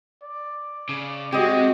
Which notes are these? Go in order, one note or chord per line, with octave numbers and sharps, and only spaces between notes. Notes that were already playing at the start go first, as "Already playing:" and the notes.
D5
C#3
G#3 C4 F#4 G4 D#5